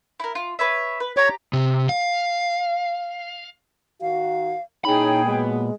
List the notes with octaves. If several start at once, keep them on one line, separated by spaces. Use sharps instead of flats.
E4 A#4
F4
B4 C#5 E5
B4
G4 C#5 A#5
C3
F5
D#3 F#4 F5
A#2 C#4 D#4 E4 G#4 C#5 G5 B5
B2 F#3 G#3 B3